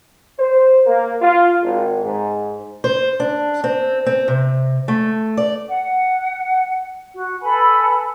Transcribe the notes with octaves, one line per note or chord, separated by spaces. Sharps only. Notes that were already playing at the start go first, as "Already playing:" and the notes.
C5
A#3
F4
G#1
G#2
C5
D4
C4
C4
C3
A3
D5
F#5
F#4
A4 B4 G#5 B5